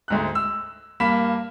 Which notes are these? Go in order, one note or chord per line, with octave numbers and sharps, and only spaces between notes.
D2 G#2 F#6
E6
G2 A#3 B5 B6 E7